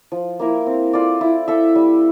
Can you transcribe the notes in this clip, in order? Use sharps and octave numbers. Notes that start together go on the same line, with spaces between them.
F3
A#3 E4 A#4
C4
F4 A4 D5
E4
A4 E5
G3